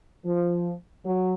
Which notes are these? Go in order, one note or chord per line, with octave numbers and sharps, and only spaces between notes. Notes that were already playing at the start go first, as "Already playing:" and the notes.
F3
F#3